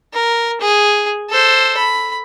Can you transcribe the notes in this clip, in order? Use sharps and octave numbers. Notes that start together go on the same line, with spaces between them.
A#4
G#4
A4 C5
B5